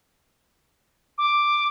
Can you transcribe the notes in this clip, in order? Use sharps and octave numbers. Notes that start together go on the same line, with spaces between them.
D6